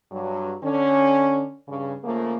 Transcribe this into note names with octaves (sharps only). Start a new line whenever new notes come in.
G2 F#3
D3 C#4
G2 C#3
C#3 F3 A3 A#3